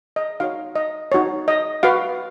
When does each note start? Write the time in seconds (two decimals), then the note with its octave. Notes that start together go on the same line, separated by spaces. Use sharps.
0.16 D#5
0.40 D#4 F#4 C#5 F5
0.76 D#5
1.12 D#4 F#4 C#5
1.48 D#5
1.83 F#4 B4 F5